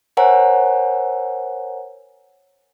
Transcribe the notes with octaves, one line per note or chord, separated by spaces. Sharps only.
A#4 C5 C#5 F#5 G#5 A#5